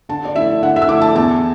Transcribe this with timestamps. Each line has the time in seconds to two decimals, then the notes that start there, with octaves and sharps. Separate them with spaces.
0.09 D3 A5
0.25 D5
0.36 A3 E4 E5
0.62 D3 F#5
0.76 E5
0.82 E6
0.89 A3 E4 D6
1.02 A5
1.15 E2 A5